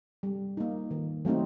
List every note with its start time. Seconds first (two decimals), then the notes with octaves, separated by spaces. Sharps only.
0.23 G3
0.57 A#3 D#4
0.91 D#3
1.25 F#3 A3 C4 D#4